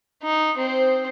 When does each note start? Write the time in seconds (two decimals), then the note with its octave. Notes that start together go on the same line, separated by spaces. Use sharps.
0.23 D#4
0.57 C4 C5